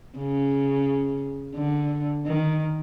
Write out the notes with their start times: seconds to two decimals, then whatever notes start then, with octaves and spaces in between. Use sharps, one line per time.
0.18 C#3
1.55 D3
2.26 D#3